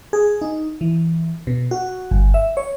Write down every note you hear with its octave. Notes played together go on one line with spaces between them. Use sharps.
G#4
D#4
E3
B2
F#4
G1
E5
C#5